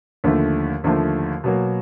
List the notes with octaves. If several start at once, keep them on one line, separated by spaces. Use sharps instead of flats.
D#2 D3 F3 A3
D#2 D3 F3 A3
B2 F#3 A#3